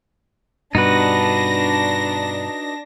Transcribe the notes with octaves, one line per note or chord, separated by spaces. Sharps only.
G2 B2 D4 D#4 F#4 B4 A#6